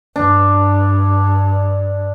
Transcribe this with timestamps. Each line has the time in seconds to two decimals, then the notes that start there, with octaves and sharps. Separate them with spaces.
0.16 G2 D4